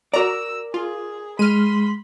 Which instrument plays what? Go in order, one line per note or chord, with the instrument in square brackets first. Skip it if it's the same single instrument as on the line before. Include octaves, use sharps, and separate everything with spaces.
[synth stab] F#4 A#5 [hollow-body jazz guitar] A#4 D5 [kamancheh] E6
[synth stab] F4 [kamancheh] G#4
[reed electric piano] G#3 [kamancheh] B5 C6 [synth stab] F6 D#7